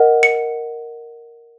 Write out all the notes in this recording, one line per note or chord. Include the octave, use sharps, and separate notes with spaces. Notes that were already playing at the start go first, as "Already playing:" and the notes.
Already playing: A#4 D#5 F#5
C#7